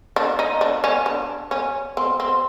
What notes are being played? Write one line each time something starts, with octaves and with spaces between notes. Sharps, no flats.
D4
D#4
D4
C#4
D4
C#4
C4
C4